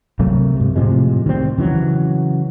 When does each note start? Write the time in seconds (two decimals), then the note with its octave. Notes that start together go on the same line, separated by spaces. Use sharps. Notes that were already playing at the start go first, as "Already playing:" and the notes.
0.19 C3 F#3 A3 A#3
0.56 G#2 C3
0.76 A2 C3 F3 G#3
1.26 D#3 G3 C4
1.58 C#3 E3 F#3